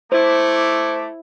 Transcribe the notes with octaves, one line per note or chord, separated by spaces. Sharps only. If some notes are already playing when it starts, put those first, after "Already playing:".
A3 E4 C5 D6